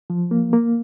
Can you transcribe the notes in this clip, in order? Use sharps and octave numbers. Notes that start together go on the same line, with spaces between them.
F3
A#3
A#3